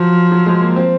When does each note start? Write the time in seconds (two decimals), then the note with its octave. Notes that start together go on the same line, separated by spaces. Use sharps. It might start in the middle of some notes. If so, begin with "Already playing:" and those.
Already playing: F3 F#3
0.31 F#3
0.46 G#3
0.62 A#3
0.76 C4